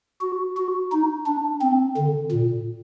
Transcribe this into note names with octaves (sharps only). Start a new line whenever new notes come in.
F#4
F#4
D#4
D4
C4
D3
A#2